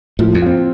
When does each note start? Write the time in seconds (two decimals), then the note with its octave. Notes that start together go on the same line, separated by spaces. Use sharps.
0.19 A2 F3
0.34 F2
0.42 C4 F4